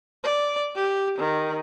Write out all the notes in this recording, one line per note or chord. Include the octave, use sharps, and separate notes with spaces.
D5
G4
D#3